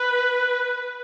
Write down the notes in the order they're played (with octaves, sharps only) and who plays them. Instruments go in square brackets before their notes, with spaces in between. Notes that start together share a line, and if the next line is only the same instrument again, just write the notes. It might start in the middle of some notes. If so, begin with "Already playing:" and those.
Already playing: [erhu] B4